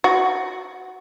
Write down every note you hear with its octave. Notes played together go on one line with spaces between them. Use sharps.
F#4